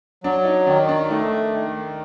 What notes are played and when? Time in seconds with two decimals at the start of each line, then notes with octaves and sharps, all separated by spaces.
0.24 F#3 D4
0.45 D#4
0.67 D#3 D4
0.89 D4
1.10 A3 D#4
1.54 D#3